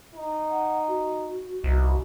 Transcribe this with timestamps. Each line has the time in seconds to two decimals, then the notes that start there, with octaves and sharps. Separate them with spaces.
0.14 D#4
0.49 F#5
0.87 F#4
1.64 C2 D#4